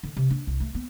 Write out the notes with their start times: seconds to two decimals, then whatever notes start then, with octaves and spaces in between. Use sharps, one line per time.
0.03 D3
0.17 C3
0.30 D4
0.47 C2
0.60 A3
0.75 B3